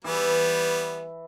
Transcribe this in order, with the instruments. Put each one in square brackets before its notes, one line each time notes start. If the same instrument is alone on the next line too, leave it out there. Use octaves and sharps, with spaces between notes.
[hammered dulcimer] E3 [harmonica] G3 B3